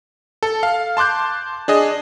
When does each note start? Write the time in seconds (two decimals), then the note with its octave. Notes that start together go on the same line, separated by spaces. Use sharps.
0.43 A4
0.63 F5
0.97 A5 C6 D6 F#6 G6
1.68 D4 G#4 D#5